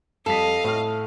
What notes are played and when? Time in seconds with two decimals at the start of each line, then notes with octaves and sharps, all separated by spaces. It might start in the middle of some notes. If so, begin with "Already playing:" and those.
0.26 F2 G3 A4 D#5 F5 B6
0.64 A2 F6